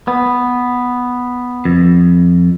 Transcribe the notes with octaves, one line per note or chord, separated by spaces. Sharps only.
B3
F2